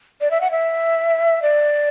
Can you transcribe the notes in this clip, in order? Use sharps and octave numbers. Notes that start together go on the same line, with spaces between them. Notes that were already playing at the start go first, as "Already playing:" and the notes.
D5
E5
F#5
E5
D5